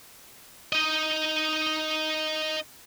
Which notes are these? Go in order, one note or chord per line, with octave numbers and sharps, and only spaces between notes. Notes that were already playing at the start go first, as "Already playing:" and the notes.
D#4 D#5